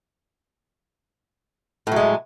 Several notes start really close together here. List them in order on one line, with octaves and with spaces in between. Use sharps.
A2 F#3 G#3